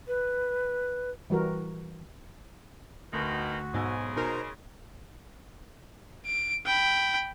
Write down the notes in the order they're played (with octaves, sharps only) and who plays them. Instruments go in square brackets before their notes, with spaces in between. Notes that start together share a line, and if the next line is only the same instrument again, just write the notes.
[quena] B4
[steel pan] E3 G3 F#4 A#4
[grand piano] D2 [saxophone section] B2 D#3 [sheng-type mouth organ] F#4
[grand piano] B1 G#5 E6 [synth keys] G#2 [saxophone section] C#3 G#3 G#4
[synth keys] B2 D#4 A#4 [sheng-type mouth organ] C5 A#5
[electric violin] D7
G5 B5